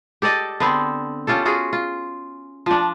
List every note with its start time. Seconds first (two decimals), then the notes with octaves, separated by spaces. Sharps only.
0.22 G4 A4 D5 D#5
0.60 D3 B3 C4
1.27 C#4 F4 G4 A4
1.45 F4 F#4 G#4
1.73 F4
2.66 F3 D4